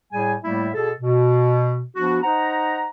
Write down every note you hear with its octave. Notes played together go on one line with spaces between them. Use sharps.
A2 G3 G#4 G#5
A2 G3 A3 A#3 E4 E5
B2 G#4 A4
B2
F3 B3 D4 F#4
D#4 C5 F#5 A#5